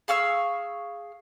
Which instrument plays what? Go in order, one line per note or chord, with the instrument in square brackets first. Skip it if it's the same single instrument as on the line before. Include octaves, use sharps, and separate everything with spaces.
[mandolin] G#4 F5 C#6 E6